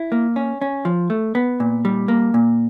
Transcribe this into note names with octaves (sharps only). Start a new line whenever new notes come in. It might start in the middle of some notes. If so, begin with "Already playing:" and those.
Already playing: E4
A#3
C#4
C#4
F3
A3
B3
A#2
G3
A#3
A#2